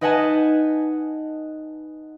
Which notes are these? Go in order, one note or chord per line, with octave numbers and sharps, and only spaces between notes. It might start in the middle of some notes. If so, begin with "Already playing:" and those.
D#4 B4 D#5 F#5 G#5 A5